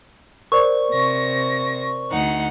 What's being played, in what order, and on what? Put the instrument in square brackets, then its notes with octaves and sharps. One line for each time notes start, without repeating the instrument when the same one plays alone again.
[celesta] A#4 C5 D5 [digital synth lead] C#6
[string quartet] C3 A#6
D2 D#4 F#5